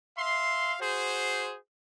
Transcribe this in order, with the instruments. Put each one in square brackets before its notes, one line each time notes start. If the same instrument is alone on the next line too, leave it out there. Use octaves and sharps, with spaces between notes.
[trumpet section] E5 F5 C6
F#4 G#4 C5